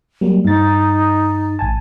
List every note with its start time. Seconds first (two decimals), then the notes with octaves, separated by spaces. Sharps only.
0.21 F#3 G3 A#3
0.45 G2 D#4 A6
1.59 A1 G#5 A5